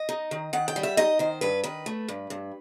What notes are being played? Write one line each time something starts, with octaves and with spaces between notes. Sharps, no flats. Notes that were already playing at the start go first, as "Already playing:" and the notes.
Already playing: D#5
D#4
D#3
D#3 F#5
G5
G3
E5
D#4 D#5
D#3 C5
G2 B4
D#3 B4
A3
G2
G2